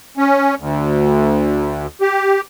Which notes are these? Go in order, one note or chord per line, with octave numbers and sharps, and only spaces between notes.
C#4
D2
G4